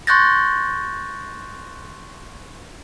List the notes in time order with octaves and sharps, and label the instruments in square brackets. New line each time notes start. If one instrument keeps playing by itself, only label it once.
[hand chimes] C6 C#6 F#6 G6 A6 A#6